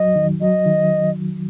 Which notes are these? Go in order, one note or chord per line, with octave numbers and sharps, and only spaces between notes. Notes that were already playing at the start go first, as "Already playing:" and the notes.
Already playing: F#3 D#5
D#3
F#3 D#5
D#3